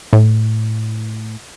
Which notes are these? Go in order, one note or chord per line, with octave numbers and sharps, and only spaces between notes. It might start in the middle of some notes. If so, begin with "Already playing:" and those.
A2